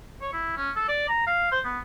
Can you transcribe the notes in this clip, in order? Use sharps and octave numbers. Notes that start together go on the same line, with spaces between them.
C#5
E4
C#4
A4
D5
A#5
F5
C5
B3